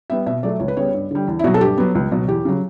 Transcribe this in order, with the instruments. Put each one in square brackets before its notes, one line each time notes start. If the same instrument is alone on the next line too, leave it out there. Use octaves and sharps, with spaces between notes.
[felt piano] G3 B3 E5
B2 E5
F#3 A3 D5
C#2 C#5
B4
C#3 G3 B3 C#5
G2
D3 G3
E2
E4
B2 F#4
F#3
A4
G2 G4
F#3 B3
C#2
B2 F#3
E2 G4
C#3 F#3